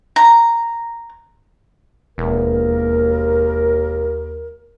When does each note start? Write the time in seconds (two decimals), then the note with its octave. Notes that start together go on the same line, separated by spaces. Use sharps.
0.16 A#5
2.18 E1 D#2 A#4